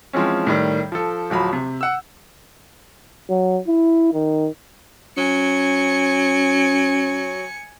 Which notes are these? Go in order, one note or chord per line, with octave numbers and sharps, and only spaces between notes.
E3 F3 G#3 C4 C#4
A2 D#3 G3
F3 A4
D1 F3 F#3 B5
C3
F#5 E6
F#3
E4
D#3
F#3 C#4 G#5 C#7